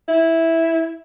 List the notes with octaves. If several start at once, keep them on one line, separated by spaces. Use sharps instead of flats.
E4